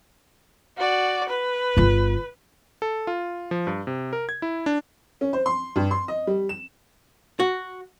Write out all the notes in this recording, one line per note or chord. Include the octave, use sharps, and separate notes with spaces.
F#4 D5
B4
G1 F4
A4
F4
F3
G2
C3
A#4
G#6
E4
D4
C#4
C5
C6
G2
C6
D#5
G3
E7
F#4